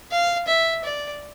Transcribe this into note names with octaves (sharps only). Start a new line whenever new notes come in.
F5
E5
D5